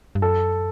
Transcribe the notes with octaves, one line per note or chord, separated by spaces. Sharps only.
G2
F#2 A4